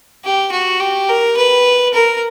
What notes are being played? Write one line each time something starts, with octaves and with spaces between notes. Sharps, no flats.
G4
F#4
G4
A#4
B4
A#4